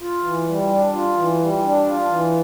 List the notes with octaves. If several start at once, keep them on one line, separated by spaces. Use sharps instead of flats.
F4
E3
G3
D4
F4
E3
G3
D4
F4
E3